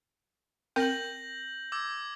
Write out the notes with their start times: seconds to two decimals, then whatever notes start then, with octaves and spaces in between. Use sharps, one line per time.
0.76 C4 A#4 G5 G6 A#6 F#7
1.72 D6 E6 G#6